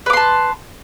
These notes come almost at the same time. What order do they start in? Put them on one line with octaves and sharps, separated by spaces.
B4 D6 C6 A5